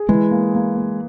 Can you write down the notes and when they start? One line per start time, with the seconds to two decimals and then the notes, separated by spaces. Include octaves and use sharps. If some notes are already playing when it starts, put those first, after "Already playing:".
Already playing: G#4
0.09 E3 G#3
0.31 A#3
0.55 A#3
0.76 A#3